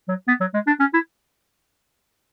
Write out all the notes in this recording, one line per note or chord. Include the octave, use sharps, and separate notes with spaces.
F#3
B3
F#3
G#3
D4
C#4
E4